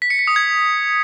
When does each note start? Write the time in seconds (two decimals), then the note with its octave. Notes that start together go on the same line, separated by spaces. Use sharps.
0.02 B6
0.10 C#7
0.19 B6
0.27 D#6
0.36 G#6